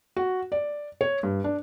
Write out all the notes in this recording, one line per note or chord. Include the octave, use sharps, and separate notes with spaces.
F#4
D5
C#5
G2
D4